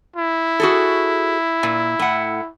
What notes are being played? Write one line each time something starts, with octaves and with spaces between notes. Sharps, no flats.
E4
F#4 G#4 A4
A#2
A2 F#5